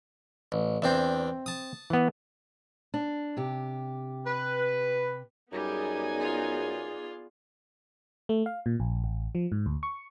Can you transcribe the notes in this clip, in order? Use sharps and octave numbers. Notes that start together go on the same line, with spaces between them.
A1
E2 C4 D4 E5 G5
A5 D#6
E3 B3
D4
C3 G4
B4
F#2 G3 B3 D#4 G#4 D5 G#5
F4
A3
F5
A#2
A#1
A1
F3
G#2
D2
C#6